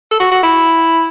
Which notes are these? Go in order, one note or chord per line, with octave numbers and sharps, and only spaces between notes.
A4
F#4
F#4
E4